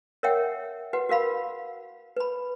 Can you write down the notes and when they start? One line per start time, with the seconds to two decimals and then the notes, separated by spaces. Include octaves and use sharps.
0.23 A#4 C#5 E5 F#5 G5
0.93 F#4 B4 F#5
1.09 F#4 A#4 F5 B5
2.17 B4 B5